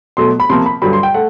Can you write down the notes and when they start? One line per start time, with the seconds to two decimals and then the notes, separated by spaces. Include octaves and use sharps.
0.17 B2 F#3 A3 C6
0.40 B5
0.50 C3 F3 A#3 C6
0.66 B5
0.82 G2 D3 F#3 B5
0.93 C6
1.03 G5
1.14 A3 F#5